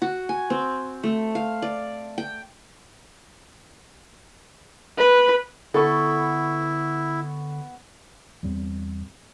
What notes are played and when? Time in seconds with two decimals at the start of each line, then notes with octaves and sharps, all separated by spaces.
0.02 F#4
0.29 G#5
0.50 C4
1.04 A3
1.35 F5
1.62 D5
2.18 G5
4.98 B4
5.74 D3 B3 E4 A4 B5 C#6
8.43 E2 G2 G3 C4